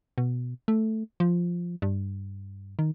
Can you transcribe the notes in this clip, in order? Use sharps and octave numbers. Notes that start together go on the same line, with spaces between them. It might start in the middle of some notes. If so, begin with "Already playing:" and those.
B2
A3
F3
G2
D#3